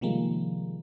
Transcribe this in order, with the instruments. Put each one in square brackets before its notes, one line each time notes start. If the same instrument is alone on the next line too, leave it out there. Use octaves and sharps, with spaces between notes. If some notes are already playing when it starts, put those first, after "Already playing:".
[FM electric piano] C3 D#3 F3 G3 G#3 A#3